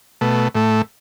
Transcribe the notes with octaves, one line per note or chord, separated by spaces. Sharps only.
B2 A3
A2 A3